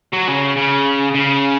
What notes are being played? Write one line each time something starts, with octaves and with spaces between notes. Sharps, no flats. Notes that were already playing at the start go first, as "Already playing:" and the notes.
F#3
C#3
C#3
C#3